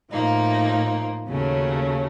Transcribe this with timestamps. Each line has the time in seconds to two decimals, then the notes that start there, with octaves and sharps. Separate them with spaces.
0.11 A2 F3 A#3 D#4
1.27 D#2 C#3 F#3 A3 C#4